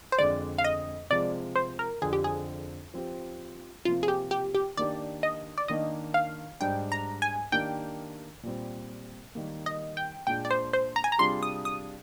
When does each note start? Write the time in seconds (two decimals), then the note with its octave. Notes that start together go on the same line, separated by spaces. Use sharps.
0.12 C5
0.18 F2 D3 G#3 D5
0.58 F5
0.64 D#5
1.10 C3 F3 G#3 D5
1.56 C5
1.79 A#4
2.02 F2 D3 F3 C4 G#4
2.13 G4
2.24 G#4
2.94 F3 C4 G4
3.85 C3 F3 A#3 F4
4.03 G#4
4.08 G4
4.31 G4
4.55 G4
4.77 D#3 A#3 D4 G4 D5
5.23 D#5
5.58 D5
5.68 D#3 A#3 D4 D#5
6.14 F5
6.60 G#2 G3 D4 G5
6.92 A#5
7.22 G#5
7.52 D#3 A#3 D4 G4 G5
8.43 A#2 G3 C4
9.35 D#3 G3 A#3
9.66 D#5
9.97 G5
10.27 A#2 G#3 D4 G5
10.45 D5
10.51 C5
10.73 C5
10.96 A#5
11.04 G#5
11.12 A#5
11.18 C3 G3 D4 F4 G#4 C6
11.43 D#6
11.65 D#6